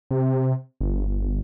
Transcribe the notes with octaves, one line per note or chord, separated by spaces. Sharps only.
C3
G1